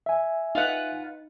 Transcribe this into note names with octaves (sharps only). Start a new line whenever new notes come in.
E5 G#5
D#4 F4 B4 F#5